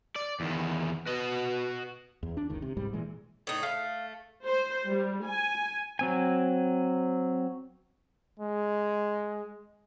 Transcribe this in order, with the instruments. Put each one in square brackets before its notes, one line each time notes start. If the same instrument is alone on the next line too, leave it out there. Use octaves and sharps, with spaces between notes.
[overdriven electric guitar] D5
E2 D#3
[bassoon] B2 [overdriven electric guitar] F#4 D#5
[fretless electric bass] E2
D4
F#1 C#2 D#3
C3
C2 G#2 G3
A#2 E3 G#3
[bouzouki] A2 D#4
[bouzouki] A3 [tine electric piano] F5
[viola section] C5
G3
G#5
[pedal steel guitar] F#3 C4 G#5
[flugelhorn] G#3